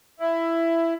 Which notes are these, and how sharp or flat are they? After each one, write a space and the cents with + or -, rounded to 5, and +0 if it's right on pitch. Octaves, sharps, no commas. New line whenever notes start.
E4 +10